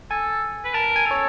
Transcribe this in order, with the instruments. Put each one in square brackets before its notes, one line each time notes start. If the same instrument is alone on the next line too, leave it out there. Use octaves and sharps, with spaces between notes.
[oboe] A4 [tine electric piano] G#5
[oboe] B4
[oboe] A#4 [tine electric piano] A5
[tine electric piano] G#5
[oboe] A4 [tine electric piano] C#5